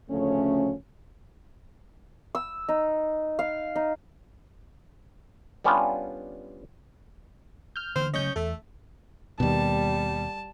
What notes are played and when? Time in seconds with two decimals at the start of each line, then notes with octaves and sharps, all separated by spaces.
0.10 D2 C#3 F3 A3 C#4
2.35 E6
2.69 D#4
3.39 F5
3.76 D#4
5.64 G3 B3 C#4 D4 F4
7.76 F6 G6
7.96 D3 E3 A#3 C5
8.14 C#3 F#3 A3 C#4 D#5 C#6 G6
8.36 E2 A3 A4 E5
9.40 D#2 B2 G3 A5